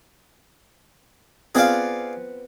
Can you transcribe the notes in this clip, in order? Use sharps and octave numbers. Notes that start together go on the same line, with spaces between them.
B3 C4 F4 G#4 D5 F5